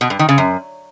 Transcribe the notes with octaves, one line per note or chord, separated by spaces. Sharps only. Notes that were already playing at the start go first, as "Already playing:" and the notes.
B2
G2
D#3
C#3
F#2